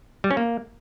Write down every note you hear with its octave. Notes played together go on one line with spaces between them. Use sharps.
G3
C#4
A#3